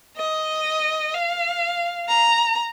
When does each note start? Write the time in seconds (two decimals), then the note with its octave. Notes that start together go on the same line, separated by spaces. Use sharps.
0.17 D#5
1.13 F5
2.09 A#5